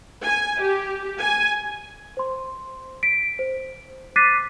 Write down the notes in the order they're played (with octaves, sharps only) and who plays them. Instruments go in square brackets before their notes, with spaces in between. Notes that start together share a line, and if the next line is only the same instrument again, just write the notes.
[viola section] G#5
G4
G#5
[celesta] C5 C6
B6 D7
C5
D6 F#6 A6 B6 C7 D#7